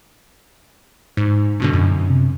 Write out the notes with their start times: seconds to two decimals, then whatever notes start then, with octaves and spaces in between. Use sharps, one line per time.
1.17 G#2
1.60 G2 B2 D3
1.73 F#2
2.10 C3